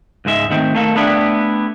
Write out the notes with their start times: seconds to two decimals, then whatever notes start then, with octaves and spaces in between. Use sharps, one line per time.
0.25 C#2 G#2 G#3 E5
0.50 D#3 A3 C4
0.75 A3 A#3 A4
0.95 A3 B3 D4 E4 G4